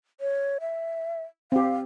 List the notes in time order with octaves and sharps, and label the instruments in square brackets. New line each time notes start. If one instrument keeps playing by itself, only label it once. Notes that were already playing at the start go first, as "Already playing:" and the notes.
[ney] C#5
E5
[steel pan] C4 G4 [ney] F5